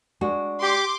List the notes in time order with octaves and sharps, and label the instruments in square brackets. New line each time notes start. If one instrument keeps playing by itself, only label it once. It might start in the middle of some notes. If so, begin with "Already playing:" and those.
[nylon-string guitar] G#3 D4 F#4
[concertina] G4 [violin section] C6 D6